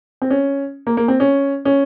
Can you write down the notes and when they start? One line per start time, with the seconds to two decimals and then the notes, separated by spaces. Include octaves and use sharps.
0.22 C4
0.30 C#4
0.87 A#3
0.97 A#3
1.08 C4
1.20 C#4
1.65 C#4